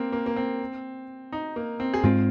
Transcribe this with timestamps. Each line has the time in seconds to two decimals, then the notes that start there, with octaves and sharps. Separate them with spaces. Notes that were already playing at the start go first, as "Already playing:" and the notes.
Already playing: A#3 C4
0.12 A#3
0.26 A#3
0.36 C4
1.32 D#4
1.56 A#3
1.80 C4
1.94 G#4
2.04 G#2 G#3 C4 F4